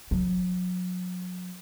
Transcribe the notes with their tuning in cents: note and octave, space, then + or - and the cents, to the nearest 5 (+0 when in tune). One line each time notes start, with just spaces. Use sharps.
F#3 -35